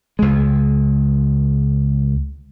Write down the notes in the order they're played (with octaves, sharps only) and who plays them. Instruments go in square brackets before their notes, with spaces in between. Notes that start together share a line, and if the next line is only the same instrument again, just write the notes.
[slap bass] C#2 G#3